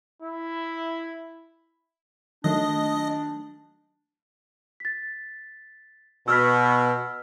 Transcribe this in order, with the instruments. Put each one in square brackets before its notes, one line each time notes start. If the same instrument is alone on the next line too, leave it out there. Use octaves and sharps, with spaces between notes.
[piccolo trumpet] E4
[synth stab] D#3 F#3 A3 [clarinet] D4 [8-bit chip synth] D#5
[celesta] A6 B6
[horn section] B2 [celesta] E6 F6 B6